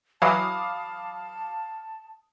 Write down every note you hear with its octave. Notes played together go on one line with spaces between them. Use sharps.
E3 F#3 F5 A5 B5 D6 D#6